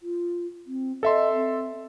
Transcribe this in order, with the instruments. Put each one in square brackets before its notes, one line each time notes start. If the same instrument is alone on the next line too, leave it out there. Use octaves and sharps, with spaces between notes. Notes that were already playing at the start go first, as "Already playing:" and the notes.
[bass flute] F4
C4
[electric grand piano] A4 E5 C6 [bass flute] D#5
[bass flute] C4